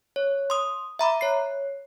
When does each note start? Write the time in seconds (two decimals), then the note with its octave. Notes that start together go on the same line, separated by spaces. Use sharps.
0.16 C#5
0.50 C6 D#6
0.99 E5 A#5 B5 D6
1.21 C#5 C7